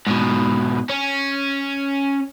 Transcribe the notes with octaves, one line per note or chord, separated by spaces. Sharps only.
G#2 B2
C#4